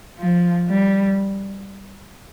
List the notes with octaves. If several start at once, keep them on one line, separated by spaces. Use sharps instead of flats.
F3
G3